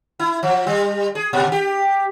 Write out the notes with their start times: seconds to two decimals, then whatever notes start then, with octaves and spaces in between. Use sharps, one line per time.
0.20 E4
0.43 F3
0.67 G3
1.15 G#4
1.33 A#2
1.52 G4